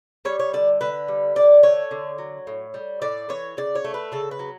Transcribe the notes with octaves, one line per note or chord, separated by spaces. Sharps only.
G3 C#5
C#5
D3 D5
D3 B4
G3
D3 D5
A3 C#5
D3
F#3
A2
G3
A2 D5
E3 C#5
C#3 D5
C#5
A3
B4
C#3 A4
B4
F#3